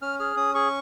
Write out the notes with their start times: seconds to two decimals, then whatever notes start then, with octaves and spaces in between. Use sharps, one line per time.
0.02 C#4 F6
0.19 G#4 F6
0.36 C#4 D#6
0.55 G#4 C#6